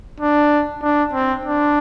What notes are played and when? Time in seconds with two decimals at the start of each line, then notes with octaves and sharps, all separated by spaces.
0.20 D4
0.82 D4
1.13 C4
1.45 D4